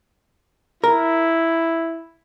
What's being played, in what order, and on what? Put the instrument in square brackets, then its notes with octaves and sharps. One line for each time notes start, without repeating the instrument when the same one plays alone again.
[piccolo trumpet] E4 [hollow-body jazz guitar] A#4